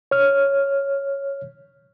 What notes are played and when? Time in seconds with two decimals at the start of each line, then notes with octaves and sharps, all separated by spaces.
0.11 C#5 F6